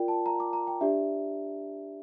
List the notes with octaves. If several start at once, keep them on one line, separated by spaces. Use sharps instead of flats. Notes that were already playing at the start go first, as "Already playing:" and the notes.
Already playing: F4 A#4 D5 G5
A5
A#5
D6
A#5
G5
D4 G4 D5 E5